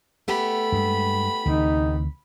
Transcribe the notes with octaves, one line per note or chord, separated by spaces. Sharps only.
A3 B3 G4 B5
G2 G#3
D2 C3 E3 D#4